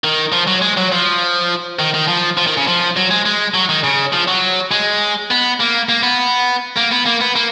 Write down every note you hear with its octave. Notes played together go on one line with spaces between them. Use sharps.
D#3
F3
F#3
G#3
F#3
F3
D#3
D#3
F3
F3
D#3
C#3
F3
F#3
G#3
G#3
F#3
D#3
C#3
F3
F#3
G#3
B3
A#3
A#3
B3
A#3
B3
A#3
B3
A#3